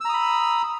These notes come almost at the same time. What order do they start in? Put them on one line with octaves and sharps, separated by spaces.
E6 A#5 D#6 B5